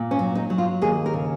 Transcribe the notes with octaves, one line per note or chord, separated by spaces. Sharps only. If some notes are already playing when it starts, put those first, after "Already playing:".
Already playing: A#2
C#4
F#3
D#4
F#3
F4
D#2 G#4
A#4
C#3